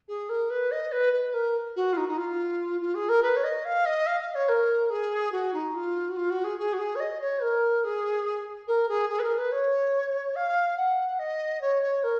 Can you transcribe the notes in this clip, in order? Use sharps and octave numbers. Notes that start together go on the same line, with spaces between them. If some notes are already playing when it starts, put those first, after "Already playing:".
G#4
A#4
B4
D#5
B4
B4
A#4
F#4
F4
D#4
D#4
F4
F4
G#4
A#4
B4
C#5
D#5
F5
D#5
F5
F5
C#5
A#4
G#4
F#4
D#4
F4
F#4
F4
F#4
G#4
G#4
F#4
G#4
C#5
D#5
C#5
A#4
G#4
A#4
G#4
G#4
B4
A#4
B4
C#5
F5
F#5
D#5
C#5
C#5
A#4